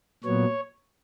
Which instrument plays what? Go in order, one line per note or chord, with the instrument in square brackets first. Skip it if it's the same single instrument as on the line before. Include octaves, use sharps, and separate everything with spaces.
[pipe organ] A#2 F#3 B3 C#5